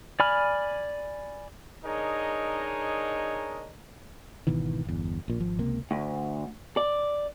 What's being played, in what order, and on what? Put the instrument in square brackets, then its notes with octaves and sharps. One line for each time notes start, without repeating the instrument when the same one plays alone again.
[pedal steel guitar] D5 G#5 B5 F6
[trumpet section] D4 D#4 G#4 A#4 C#5 D#5
[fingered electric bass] G#1 B2 D#3 E3
G1 E2
A#1 A#2
G#1 F3
C#2 C3 A#3
[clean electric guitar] D2
D5